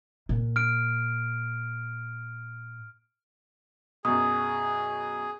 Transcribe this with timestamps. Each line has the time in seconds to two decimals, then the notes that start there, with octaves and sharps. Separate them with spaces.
0.29 A#2
0.56 F6 D7
4.05 F#2 B2 G#4 D#6